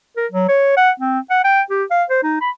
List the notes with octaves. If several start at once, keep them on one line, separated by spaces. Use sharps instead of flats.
A#4
F#3
C#5
F#5
C4
F#5
G5
G4
F5
C5
D#4
B5